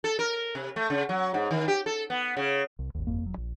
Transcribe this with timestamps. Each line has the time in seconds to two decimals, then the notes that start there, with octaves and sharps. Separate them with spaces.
0.04 A4
0.19 A#4
0.55 C3
0.76 A3
0.90 C#3
1.09 F#3
1.34 G#2
1.51 D#3
1.68 G4
1.86 A4
2.10 B3
2.37 C#3
2.79 C2
2.95 G#1 D#2
3.07 G1 F2 A#3
3.24 E1 F#3
3.37 A#1